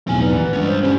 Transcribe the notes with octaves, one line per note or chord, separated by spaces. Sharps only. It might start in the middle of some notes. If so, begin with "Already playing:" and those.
B1 E2 A2 C4 G#5
D#4 B4 D5 F#5
D#2 E3
G2 G#3 C#4
C5
A2 C#4 G4